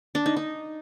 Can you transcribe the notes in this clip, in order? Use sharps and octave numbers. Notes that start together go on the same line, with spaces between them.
D4
D#4
D#4